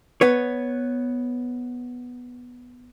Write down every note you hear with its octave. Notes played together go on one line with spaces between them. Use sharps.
B3 B4 C#5